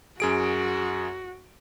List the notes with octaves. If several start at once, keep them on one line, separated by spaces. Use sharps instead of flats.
F#2 F#4 G#4 D7